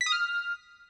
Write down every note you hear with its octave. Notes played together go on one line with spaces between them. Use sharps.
B6
D#6
F6